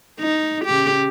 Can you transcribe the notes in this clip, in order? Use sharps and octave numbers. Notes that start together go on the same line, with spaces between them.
D#4
C#3 G4